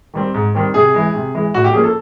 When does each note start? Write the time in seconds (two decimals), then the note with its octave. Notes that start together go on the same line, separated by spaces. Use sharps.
0.14 D#3 G3 C4
0.34 G#2
0.55 D#3 G3 C4
0.74 C3 G#4
0.94 E3 G#3
1.15 C3
1.35 E3 G#3
1.54 A2 F#4
1.64 G4
1.73 F3 A#3 C#4 G#4
1.83 A4